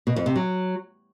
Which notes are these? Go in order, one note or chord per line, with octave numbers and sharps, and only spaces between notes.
B2
F2
C3
F#3